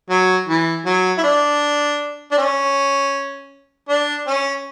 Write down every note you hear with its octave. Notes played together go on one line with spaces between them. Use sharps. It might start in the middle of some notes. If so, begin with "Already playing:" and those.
F#3
E3
F#3
E4
D4
D4
C#4
D4
C#4